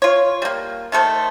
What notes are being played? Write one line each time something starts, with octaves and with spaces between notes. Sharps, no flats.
F4 C#5
G3 A#3
D#3 A3 A4 C5